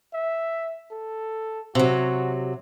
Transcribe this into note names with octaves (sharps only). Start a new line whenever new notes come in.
E5
A4
C3 F#3 F#4